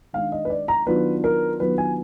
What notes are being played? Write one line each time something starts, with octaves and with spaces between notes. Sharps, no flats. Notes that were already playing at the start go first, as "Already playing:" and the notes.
D#3 G#3 D4 F5
D#5
B4
D5
A#5
D#3 F#3 B3 D4 F4 B4
A#4
D#3 F#3 B3 D4 F4 B4
G#5